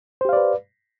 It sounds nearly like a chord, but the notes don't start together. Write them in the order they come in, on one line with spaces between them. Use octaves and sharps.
C5 G4 F5 D5 B4